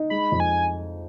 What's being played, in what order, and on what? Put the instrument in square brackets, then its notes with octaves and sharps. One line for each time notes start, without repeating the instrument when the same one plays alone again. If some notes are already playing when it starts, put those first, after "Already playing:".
Already playing: [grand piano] D#4
[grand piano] G#3 [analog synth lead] B5
[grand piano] F2
[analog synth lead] G#5